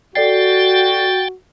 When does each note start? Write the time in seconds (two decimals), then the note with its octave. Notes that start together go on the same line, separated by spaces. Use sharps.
0.15 F#4 A4 D5 G5 A6 C7